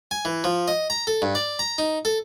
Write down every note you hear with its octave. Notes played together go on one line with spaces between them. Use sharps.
G#5
E3
F3
D#5
A#5
A4
G2
D5
A#5
D#4
A4